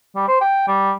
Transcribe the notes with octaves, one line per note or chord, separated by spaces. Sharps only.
G3
C5
G5
G3